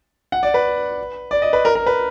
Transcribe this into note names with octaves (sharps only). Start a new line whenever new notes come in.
F#5
D5
B4
D5
D#5
B4
A#4
A#4
B4